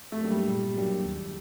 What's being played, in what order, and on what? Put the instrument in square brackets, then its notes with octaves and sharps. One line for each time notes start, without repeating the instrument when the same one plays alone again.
[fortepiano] A3
[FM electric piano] F#3 A#3 D4 G4
[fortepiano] G3
[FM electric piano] A#2
F#3 A#3 D4 G4
D#2